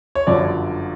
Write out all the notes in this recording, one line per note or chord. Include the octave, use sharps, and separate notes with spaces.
C#5
G1 F#2 D3 F3 D5